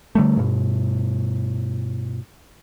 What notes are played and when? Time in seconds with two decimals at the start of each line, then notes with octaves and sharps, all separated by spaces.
0.15 D3 G3 A3
0.37 G2 B2